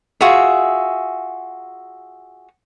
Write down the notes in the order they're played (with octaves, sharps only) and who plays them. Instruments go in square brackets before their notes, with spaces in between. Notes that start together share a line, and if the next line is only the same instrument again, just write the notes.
[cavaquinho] F4 F#4 G#4 E5